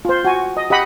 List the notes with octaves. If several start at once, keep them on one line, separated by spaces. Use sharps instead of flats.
F4 C5
F#4 G#5
D#5
G4 D#5 F#5 B5